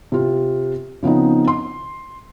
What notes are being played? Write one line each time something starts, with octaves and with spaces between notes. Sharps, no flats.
C3 F4
C#3 F3 B3 C4 D#4
C6